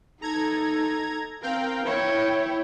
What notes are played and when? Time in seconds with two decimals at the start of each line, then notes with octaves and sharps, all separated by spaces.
0.22 D#4 A4 A#5 G#6
1.42 C4 A#4 F5 G5
1.86 E4 C#5 G5